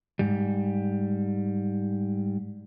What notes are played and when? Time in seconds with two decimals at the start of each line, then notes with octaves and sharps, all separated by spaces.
0.19 G#2 G3